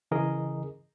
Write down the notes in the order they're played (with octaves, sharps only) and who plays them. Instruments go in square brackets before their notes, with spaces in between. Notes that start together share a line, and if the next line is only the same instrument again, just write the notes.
[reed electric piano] C#3 E3 G#4 A#4 D#5